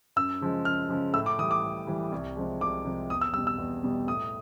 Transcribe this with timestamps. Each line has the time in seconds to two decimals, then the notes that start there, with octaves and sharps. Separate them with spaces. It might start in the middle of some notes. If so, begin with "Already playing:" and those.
0.16 F#2 E6
0.41 C#3 F3 G#3
0.65 F#2 F6
0.89 C#3 F3 G#3
1.14 A2 E6
1.26 D6
1.39 E3 D#6
1.42 G3
1.51 D6
1.63 A2
1.87 E3 G3
2.12 C2
2.36 C3 F3 G#3
2.61 C2 D6
2.85 C3 F3 G#3
3.10 E2 D#6
3.21 E6
3.34 B2 G3 E6
3.47 E6
3.58 E2
3.84 B2 G3
4.07 A2 D#6